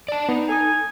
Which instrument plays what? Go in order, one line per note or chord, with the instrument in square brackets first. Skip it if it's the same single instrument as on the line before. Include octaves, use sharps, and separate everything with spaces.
[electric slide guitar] D5 A5
[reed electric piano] B3 [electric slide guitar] D#4
[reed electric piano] A4 D#6 [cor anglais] G#5